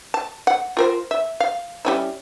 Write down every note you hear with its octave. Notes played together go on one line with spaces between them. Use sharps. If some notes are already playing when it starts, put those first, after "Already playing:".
A5
F#5
F4 A#4 C5
E5
F5
G3 C#4 E4